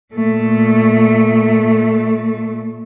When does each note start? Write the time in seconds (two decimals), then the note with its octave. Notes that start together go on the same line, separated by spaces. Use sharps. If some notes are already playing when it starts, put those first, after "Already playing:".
0.14 A#2 A3